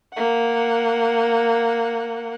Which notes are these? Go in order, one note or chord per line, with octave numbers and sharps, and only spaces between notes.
A#3 F#5